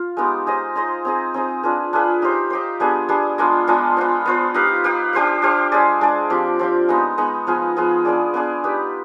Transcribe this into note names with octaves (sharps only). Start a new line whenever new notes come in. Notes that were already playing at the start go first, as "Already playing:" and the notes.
Already playing: F4
G#3 B3 D#4 G4
D#4 G#4 C5 D#5
D#4 G#4 C5 D#5
C4 D#4 G#4
C4 D#4 G#4
D4 F4 G#4 B4
D4 F4 G#4 B4
D#4 G4 C5
D#4 G4 C5
G3 B3 D4 G#4
G3 B3 D4 G#4
G#3 B3 D4 F4
G#3 B3 D4 F4
B3 F4 C5
B3 F4 C5
D#4 G4 B4 F5
D#4 G4 B4 F5
D4 G4 C5 F5
D4 G4 C5 F5
G#3 D4 G#4 D5
G#3 D4 G#4 D5
F3 C4 G4
F3 C4 G4
G#3 B3 D#4
G#3 B3 D#4
F3 B3 F4 G#4
F3 B3 F4 G#4
B3 D4 G#4 D5
B3 D4 G#4 D5
D#4 G4 B4